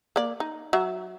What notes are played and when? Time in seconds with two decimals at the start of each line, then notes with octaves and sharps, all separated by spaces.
0.16 A#3 D5
0.40 D#4
0.73 F#3 E5